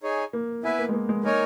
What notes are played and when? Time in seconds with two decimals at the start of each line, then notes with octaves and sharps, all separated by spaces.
0.03 D#4 G#4 C#5 G#5
0.33 A#3
0.63 B3 E4 B4 E5 G#5
0.79 A#3
0.89 G#3
0.93 A#3
1.09 G#3
1.23 A#3 D#4 A#4 C#5 G#5